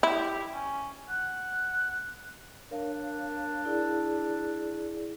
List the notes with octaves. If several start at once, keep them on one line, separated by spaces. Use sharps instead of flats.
E4 G4
C#4
F#5
D4 A#4 C#5 F5
E4 G#4 D5